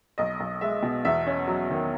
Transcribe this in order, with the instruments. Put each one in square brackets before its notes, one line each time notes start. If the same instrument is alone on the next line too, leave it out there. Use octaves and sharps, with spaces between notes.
[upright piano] B1 D#5
B1
G#3 E5
B2
E2 E5
C#4
F#3
D#3